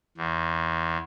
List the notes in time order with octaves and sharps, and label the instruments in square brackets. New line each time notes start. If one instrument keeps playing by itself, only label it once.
[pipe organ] E2